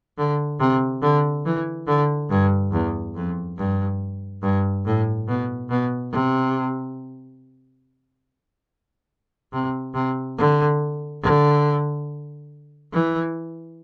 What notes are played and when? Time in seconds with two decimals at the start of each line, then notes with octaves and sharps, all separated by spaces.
0.18 D3
0.60 C3
1.02 D3
1.45 E3
1.87 D3
2.30 G2
2.72 E2
3.15 F2
3.58 G2
4.43 G2
4.86 A2
5.28 B2
5.70 B2
6.12 C3
9.53 C3
9.94 C3
10.38 D3
11.22 D3
12.92 E3